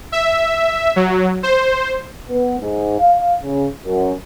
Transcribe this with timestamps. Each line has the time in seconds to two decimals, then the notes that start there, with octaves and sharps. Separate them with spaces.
0.12 E5
0.96 F#3
1.43 C5
2.27 B3
2.59 G#2
2.99 F5
3.41 C#3
3.82 F#2